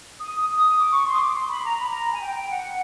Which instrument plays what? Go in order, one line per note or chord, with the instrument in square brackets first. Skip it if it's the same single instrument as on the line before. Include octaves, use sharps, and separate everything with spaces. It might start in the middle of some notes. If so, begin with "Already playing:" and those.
[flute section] D#6
D#6
D6
C#6
C6
D#6
D6
C6
B5
A#5
B5
A#5
G#5
G5
G5
F#5